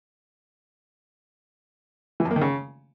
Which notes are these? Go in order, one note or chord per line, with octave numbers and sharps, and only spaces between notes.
E3
F#2
A#3
D#3
C#3